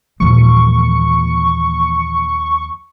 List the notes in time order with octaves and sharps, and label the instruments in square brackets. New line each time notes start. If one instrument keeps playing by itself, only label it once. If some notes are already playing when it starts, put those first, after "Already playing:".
[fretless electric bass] D#2 F3 G#3 [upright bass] A#2 E3 [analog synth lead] C#6